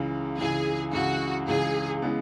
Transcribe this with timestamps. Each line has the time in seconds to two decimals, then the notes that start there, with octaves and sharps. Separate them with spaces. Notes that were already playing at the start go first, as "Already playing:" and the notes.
Already playing: C#2 C#3 E3
0.39 C#2 C#3 E3 G#4
0.93 C#2 C#3 E3 F#4
1.47 C#2 C#3 E3 G#4
2.02 C#3 E3 G#3 B3